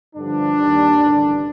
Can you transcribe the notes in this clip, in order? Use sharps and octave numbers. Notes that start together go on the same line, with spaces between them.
G2 D3 F3 D4
D#2 D#3 G3
A1 G2 D3